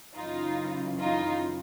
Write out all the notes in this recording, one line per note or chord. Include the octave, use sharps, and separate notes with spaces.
F#2 C#3 E3 D#4 F4
D#4 F4